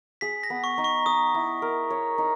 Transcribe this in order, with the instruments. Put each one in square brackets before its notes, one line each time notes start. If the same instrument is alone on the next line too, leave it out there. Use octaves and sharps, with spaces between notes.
[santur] G#4 [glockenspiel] B6
[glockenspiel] A#6
[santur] B3
[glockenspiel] C#6
[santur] D#4
[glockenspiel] C#6
[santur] D#5 [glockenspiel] D#6
[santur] E4
A#4
C#5
D#4